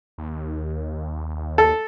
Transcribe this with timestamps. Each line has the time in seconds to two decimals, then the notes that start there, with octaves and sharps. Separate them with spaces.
0.18 D#2
1.58 A4